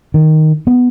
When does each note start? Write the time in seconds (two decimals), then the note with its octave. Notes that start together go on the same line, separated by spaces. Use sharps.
0.14 D#3
0.67 B3